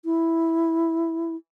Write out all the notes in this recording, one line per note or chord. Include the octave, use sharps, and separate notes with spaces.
E4